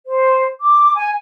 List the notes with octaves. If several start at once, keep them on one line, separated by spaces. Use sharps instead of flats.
C5
D6
G#5